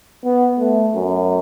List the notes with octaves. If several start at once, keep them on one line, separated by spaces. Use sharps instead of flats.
B3
A3
F#2